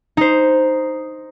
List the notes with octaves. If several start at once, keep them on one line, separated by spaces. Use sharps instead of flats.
D#4 C5